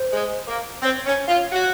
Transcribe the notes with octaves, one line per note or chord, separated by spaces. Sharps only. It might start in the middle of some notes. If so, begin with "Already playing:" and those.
Already playing: C5
G#3
A#3
C4 C#5
C#4
F4
F#4